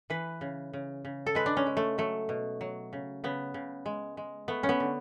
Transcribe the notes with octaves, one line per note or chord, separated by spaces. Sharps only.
E3 B4
C#3
C#3
C#3
A4
G#3 B4
D4
C#4
G#3
A3
F#3 A3
B2
F#3
C#3
C#3 B3
C#3
G#3
G#3
A3 B3
C#4
B3
D3